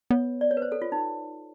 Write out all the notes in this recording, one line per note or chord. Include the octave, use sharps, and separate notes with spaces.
B3 C#5
D5
C#5
B4
C5
A4
F4
D#4